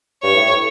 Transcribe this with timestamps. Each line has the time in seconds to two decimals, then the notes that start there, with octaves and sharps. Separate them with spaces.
0.23 G2 C#5
0.34 A2